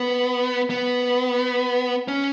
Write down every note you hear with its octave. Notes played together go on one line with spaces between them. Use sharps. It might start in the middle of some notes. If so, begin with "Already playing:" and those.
Already playing: B3
B3
C#4